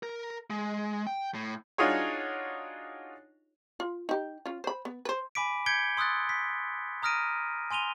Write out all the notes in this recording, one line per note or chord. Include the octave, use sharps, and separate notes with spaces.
A#4
G#3
G5
A2
D4 D#4 F4 F#4 G#4 C#5
F4
D#4 G4
C#4 F4
C5 B5
B3
B4 C5
G#5 B5 D6 B6 D7
G6 G#6 B6 C#7 D7 G7
C6 D#6 E6 F#6 A6
B6
A#5 D#6 F6 A#6 D7 D#7
G#5 C6 D#7 F7 G7